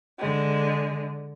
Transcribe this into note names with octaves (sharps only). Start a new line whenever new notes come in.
D3 G#3